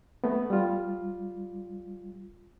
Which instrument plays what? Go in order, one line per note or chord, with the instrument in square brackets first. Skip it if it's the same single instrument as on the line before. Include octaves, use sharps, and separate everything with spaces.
[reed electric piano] A3 B3
G3 F4